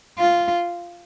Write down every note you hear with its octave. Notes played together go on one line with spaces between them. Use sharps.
F4